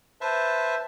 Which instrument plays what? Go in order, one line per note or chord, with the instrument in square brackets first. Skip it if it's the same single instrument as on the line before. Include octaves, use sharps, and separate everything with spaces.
[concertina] B4 C5 E5 A5